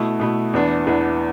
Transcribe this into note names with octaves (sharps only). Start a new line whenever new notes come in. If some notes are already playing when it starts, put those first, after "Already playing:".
Already playing: B2 A3 E4
B2 A3 E4
E2 E3 B3 D4
E2 E3 B3 D4